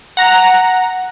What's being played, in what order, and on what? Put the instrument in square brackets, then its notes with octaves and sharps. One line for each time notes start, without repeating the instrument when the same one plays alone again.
[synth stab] F#5 A#5 A#6